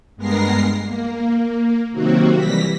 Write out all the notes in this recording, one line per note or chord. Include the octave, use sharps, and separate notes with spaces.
G2 G#3 B3 A#4 A#6 C7
A#3
C3 D#3 F#3 A#3 C4 F#4
E3 G3 A#6 B6